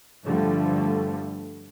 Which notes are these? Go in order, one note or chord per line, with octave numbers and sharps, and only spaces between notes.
G2 D3 F3 G3 A3